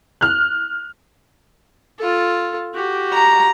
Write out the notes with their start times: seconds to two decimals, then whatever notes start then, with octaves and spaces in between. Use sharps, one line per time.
0.21 F6 F#6
1.99 F4 A4
2.74 F#4 G4
3.13 A#5